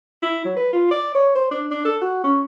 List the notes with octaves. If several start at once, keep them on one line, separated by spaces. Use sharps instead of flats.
E4
F#3
B4
F4
D5
C#5
C5
D4
D4
A4
F#4
C#4